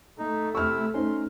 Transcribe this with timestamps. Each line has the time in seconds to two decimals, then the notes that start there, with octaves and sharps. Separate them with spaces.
0.19 A3 D#4
0.55 C3 E4 C#6 E6 F6
0.94 C#4 D#4 C5 C6